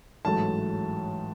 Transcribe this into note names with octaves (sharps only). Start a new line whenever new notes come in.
A1 G#2 F#3 A3 A5